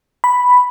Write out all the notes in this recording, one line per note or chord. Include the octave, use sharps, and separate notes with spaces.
B5